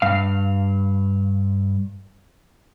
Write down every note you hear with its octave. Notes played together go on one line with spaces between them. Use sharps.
G2 F5